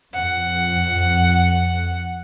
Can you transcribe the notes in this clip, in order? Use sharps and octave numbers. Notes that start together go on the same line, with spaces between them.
F2 F#5